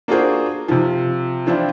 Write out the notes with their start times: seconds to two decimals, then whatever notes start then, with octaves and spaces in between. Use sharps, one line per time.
0.08 A#3 D4 F4 F#4 G#4 C5
0.68 C3 F3
1.46 E3 F3 C4 D4 E4 F4